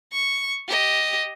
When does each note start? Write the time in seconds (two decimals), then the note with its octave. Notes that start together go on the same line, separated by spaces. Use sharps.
0.12 C#6
0.68 G4 D#5